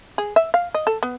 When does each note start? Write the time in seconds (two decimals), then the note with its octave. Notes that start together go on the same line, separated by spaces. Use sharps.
0.18 G#4
0.36 E5
0.54 F5
0.75 D#5
0.87 A4
1.03 B3